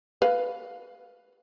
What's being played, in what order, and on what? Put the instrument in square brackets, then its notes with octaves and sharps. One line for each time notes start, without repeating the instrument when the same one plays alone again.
[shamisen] B4 F5